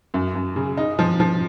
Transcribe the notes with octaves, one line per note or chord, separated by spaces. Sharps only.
F#2
F#2
C#3
D#4
F3
F3